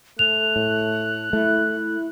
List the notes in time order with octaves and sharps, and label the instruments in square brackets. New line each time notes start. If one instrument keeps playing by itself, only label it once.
[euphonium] A3 [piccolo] F#6 [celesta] F7
[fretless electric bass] A2
[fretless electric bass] A3 [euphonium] E4
[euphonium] E4